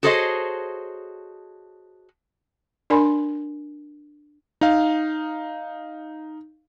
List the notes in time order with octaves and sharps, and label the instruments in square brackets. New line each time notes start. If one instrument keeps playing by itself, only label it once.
[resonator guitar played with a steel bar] F#4 G#4 A4 C5 C#5 D#5
[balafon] D4 A#4 D5 G#5 B5 C6
[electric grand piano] D#4 F5